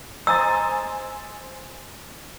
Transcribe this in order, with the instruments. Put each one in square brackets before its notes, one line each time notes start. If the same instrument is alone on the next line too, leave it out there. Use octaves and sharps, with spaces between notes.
[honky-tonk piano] C5 G#5 A6 [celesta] D#5 A#5 D#6 [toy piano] E6